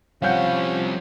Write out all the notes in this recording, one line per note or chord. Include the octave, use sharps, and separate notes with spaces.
F3 G3 C4 C#4 F5 F#5 G6